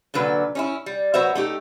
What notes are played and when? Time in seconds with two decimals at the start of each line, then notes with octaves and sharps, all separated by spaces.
0.14 A#2 D3 F#3 B4
0.55 C#4 D#4 E4
0.86 G3
1.14 F#3 B3 C5 E5
1.35 A3 D#4 G4